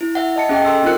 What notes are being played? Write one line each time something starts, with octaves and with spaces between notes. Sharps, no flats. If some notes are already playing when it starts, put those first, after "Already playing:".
E4
E5 F#5
D#5 A5 C#7
C#4 G#4 D#5 G5
A4 C6 E6
C4 D#4 F4 A#4 F#6 C#7